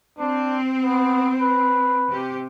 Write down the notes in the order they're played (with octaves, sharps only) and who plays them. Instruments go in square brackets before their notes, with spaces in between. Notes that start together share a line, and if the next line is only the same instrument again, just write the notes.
[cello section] C4 [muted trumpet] D4
[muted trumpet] B3
B4
[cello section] C3 G4